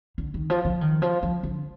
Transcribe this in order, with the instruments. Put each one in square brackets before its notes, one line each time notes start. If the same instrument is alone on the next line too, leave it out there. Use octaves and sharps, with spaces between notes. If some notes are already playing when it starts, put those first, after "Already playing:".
[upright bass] D3
D#3
F3
F3
D#3
F3
F3
D3